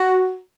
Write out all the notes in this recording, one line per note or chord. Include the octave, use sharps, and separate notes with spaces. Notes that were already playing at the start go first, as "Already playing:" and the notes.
Already playing: F#4